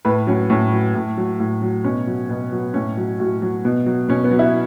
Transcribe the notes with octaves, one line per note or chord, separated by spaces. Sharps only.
A2 B4
F#3 C#4
A2 C#4
F#3
A2
F#3
A2
F#3
B2 C#4
F#3
B2 B3
F#3
A2 C#4
F#3
A2 F#4
F#3
B2
F#3
B2 C#4
B3
F#3
E4